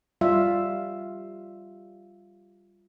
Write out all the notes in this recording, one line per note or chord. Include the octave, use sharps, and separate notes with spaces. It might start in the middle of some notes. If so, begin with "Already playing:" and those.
G3 F4 E5